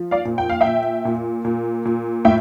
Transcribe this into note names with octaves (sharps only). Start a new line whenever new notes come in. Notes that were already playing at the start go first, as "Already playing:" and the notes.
Already playing: F3
D5 F5
A#2
G5
F5
A#2 E5 G5
A#2
A#2
A#2
A2 E5 G5